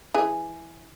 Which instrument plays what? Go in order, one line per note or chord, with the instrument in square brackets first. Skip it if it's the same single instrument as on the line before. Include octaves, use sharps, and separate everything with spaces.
[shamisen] E3 G#4